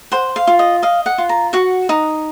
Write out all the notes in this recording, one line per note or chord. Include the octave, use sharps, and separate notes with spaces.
C5 F#5
F5
F4
D#5
D#5 F5
F#5
F4
A#5
F#4 F#5
D#4